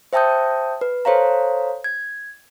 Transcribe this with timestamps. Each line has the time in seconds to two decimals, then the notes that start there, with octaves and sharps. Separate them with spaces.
0.13 C5 E5 G5 A5 D#6 G6
0.81 B4
1.05 A4 C5 C#5 F5 A#5
1.84 G#6